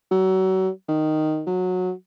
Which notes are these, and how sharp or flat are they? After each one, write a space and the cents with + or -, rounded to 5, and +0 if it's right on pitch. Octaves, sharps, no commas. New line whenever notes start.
F#3 +30
D#3 -5
F#3 -15